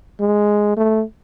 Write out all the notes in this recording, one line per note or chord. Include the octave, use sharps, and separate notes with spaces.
G#3
A3